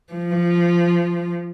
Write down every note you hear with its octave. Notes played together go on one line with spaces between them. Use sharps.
F3